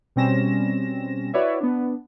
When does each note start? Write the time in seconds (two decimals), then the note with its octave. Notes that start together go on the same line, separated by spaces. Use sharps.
0.16 B2 G3 C4 C#4 A#6 E7
1.33 E4 F#4 B4 C#5 D5 E5
1.60 B3 D4